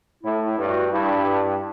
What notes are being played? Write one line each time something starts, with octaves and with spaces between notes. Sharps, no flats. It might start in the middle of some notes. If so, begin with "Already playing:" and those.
A2 E4
E4
G2
F#4
G2 E4